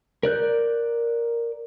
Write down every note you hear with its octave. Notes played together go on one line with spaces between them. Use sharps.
A#4 D5 F#6 G6